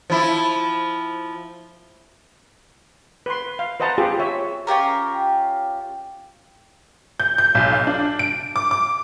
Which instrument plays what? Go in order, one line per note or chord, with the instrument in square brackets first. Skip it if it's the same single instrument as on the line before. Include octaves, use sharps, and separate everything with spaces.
[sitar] F3 E4
[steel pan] B4 C6
F5
B4 C5 D#5 F#5 A5 A#5
F4 G4 G#4 C5
C#5 E5
[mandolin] C#4 F4 G4 A#4
[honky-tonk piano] G6
G6
B1
F5
D4
D7
D6
D6